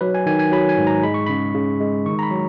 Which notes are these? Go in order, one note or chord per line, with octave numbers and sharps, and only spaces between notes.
F#3 B4
G#5
D#3 G#5
G#5
F#3 B5
G#5
G#2
A#5
G#3 B5
C#6
C#3 B5
C#3
G#3
D#3 C#6
A#5
B5
F#3